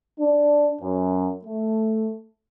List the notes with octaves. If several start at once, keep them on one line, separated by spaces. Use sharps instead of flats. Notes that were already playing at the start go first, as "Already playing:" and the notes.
D4
F#2
A3